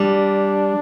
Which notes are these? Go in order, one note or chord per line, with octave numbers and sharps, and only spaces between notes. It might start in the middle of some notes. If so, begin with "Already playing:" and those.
Already playing: G3 D4